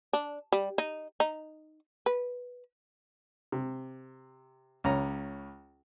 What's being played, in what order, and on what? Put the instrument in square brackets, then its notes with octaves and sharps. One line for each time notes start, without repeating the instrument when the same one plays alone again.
[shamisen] D4
G3
D#4
D#4
B4
[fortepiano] C3
C#2 C#4 A#5